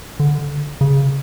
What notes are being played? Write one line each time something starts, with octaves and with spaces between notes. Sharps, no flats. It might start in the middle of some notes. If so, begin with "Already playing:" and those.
D3
C#3